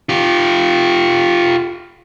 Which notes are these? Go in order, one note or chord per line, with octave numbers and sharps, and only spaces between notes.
F4 G4